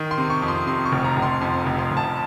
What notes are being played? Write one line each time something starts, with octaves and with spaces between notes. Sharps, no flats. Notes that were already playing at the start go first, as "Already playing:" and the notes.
Already playing: D#3
C6
C3
C#6
F2
C6
C3 C6
C#6
F1
A#5
F1
C6
F2 C6
F1
C6
F1
A5